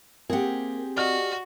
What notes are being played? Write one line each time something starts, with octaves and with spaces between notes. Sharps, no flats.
A#3 C4 G4 G#4 F#5
F#4 D5 D#5 F6